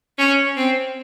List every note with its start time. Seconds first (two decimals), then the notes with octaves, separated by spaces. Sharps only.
0.18 C#4
0.57 C4